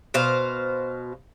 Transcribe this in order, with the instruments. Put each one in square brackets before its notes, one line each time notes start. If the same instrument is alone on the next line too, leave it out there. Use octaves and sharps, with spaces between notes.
[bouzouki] B2 C5 F5